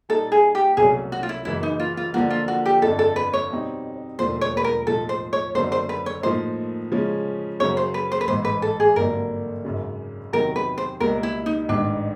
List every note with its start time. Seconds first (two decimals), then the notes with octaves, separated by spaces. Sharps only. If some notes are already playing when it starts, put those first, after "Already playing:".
0.09 A#2 G3 A#3 D#4 A4
0.32 G#4
0.55 G4
0.77 C2 B2 F#3 A3 C#4 G#4
1.12 F#4
1.23 F4
1.29 E4
1.45 F#1 F#2 C#3 E3 E4
1.63 D#4
1.80 F4
1.97 F4
2.14 D3 F3 A#3 F#4
2.30 F4
2.48 F#4
2.66 G4
2.82 G1 F2 D3 A4
2.99 A4
3.16 B4
3.33 C#5
3.50 B2 G3 C4 D#4
4.19 E1 D#2 D3 F3 A3 C5
4.41 C#5
4.57 B4
4.64 A#4
4.86 B1 A2 F3 A4
5.09 C5
5.33 C#5
5.55 F#1 F#2 D3 F#3 B3 C5
5.72 C5
5.89 B4
6.06 C#5
6.23 A2 F3 A#3 D#4 C5
6.92 C#3 F3 G#3 C#4
7.59 F#2 C#3 F#3 C#5
7.77 C5
7.94 B4
8.12 C5
8.21 B4
8.28 A1 G#2 E3 C5
8.45 B4
8.62 A4
8.80 G#4
8.96 G#1 G2 D3 F#3 A#3 A#4
9.65 G#1 F#2 C#3
10.33 E2 C3 D#3 F#3 A#4
10.56 B4
10.78 C5
11.00 C#2 B2 G3 A#3 A#4
11.23 E4
11.46 D#4
11.69 A1 G#2 D#3 D4